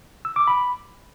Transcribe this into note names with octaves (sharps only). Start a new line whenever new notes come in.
E6
D6
B5